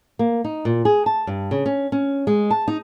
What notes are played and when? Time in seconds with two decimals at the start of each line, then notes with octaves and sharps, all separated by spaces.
0.19 A#3
0.44 D#4
0.65 A#2
0.85 G#4
1.06 A5
1.27 G2
1.51 C#3
1.66 C#4
1.92 C#4
2.27 G#3
2.50 A5
2.68 D#4